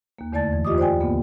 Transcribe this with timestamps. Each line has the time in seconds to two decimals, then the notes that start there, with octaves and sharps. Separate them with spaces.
0.19 D#2 A#3
0.33 E2 D3 A3 D5 A5 A6
0.51 F#2 E3
0.65 F4 G4 D#5 D6 D#6
0.78 C5 D5 G5 G#5
1.00 D2 G2 A#2 C#3 A#3 B3